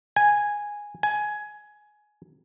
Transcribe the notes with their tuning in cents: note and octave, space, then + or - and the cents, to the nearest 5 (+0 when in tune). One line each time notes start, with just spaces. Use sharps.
G#5 -5
G#5 +15